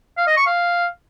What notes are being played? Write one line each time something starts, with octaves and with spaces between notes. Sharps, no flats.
F5
D#5
C#6
F5